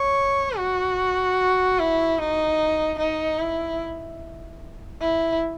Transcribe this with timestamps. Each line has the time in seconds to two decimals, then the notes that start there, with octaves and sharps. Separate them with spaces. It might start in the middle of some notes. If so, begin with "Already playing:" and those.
Already playing: C#5
0.58 F#4
1.79 E4
2.19 D#4
2.99 D#4
3.39 E4
5.01 E4